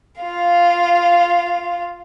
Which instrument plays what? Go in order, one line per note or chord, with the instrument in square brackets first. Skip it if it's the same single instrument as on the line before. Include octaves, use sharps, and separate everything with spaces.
[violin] F4 F5